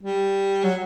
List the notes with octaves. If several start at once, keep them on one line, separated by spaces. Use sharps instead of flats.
G3
F#3